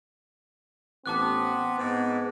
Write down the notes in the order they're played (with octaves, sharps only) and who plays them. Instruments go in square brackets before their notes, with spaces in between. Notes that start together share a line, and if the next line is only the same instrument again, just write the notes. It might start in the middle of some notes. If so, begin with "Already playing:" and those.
[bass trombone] A1 [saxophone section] B3 [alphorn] C4 [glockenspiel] A5 D6 F#6
[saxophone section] G#2 [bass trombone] B3